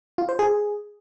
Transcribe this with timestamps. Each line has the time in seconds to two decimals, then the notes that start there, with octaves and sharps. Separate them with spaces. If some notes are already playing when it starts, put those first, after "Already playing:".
0.18 F4
0.29 C5
0.39 G#4